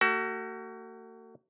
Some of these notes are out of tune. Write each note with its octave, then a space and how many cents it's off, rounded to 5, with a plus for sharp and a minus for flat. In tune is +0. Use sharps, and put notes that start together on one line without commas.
A3 +45 F#4 +30